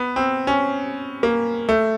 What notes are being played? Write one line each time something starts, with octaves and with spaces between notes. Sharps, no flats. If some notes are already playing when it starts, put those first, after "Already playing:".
Already playing: B3
C4
C#4
A#3
A3